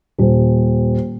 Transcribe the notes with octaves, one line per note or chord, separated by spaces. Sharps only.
D#1